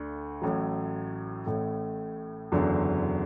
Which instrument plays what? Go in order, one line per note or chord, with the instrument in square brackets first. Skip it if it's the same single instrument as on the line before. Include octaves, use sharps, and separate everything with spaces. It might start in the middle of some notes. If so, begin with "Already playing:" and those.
Already playing: [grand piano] D2 D3 A3
A1 A2 F#3
A1 A2 A3
F#1 E2 D3 F#3